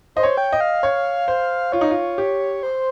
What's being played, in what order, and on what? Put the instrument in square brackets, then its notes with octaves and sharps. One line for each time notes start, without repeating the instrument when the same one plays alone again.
[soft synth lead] C5 [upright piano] D#5
[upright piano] C#5
[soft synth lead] G5
[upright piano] D#5
[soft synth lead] F5
[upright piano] C#5
C5
[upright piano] F4 [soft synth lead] C#5
[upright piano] D#4
F4
G4
[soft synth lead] C5